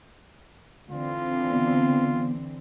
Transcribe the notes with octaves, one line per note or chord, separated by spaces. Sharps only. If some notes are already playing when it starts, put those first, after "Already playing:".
D3 E3 C4 F4
B3